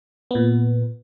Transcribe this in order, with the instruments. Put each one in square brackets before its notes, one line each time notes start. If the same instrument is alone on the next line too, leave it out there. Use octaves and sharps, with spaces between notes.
[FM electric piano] A#2 B3